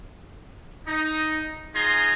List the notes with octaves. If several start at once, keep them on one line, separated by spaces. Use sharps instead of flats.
D#4
D#4 F4 G#4 G#5 A#5 C6